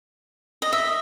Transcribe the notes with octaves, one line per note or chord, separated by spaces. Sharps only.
D#5
E5